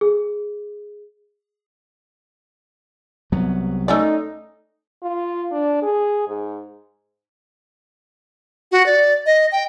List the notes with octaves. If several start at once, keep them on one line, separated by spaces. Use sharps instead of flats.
G#4
C2 F#3 B3
A3 C#4 D#4 D5
F4
D4
G#4
G#2
F#4
D5
D#5
G5